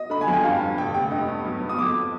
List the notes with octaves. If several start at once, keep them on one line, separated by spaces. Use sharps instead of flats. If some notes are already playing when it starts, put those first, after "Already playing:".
Already playing: D#5
D3 B5
G#5
F2
G5
G2 F5
G2
F1 G5
F1 G5
G2 D#5
G2
B1
B3
D#6
F2 D6